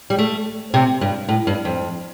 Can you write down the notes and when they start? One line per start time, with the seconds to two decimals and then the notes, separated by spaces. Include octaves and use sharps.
0.10 G3
0.19 A3
0.74 C3
1.01 G2
1.29 A2
1.47 G2
1.65 F2